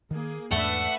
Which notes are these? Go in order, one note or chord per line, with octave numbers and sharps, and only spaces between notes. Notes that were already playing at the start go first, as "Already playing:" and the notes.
D#3 A#3 G#4
E2 G#2 A3 D4 B4 E5 F#5